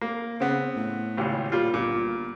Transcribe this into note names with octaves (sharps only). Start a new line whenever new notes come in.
A#3
C#3 B3 C4
A2
G#1 C#2 G4
A#2 G3 F4
G1 A#2